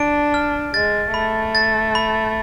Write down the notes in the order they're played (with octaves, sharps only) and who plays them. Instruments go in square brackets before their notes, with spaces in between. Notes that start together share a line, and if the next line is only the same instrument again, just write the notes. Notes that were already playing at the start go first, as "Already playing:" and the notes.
Already playing: [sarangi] D4 [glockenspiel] D7
[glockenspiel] F6
[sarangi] G#3 [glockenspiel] A6
[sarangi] A3 [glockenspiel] B5
[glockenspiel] A6
B5